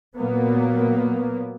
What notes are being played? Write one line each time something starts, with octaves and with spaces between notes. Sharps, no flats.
A#2 F#3 A#3 B3